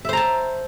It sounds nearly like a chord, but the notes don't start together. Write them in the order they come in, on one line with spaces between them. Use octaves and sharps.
E5 C5 A#5 A5